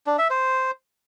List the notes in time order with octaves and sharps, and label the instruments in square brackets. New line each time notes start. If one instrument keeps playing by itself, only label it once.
[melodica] D4
E5
C5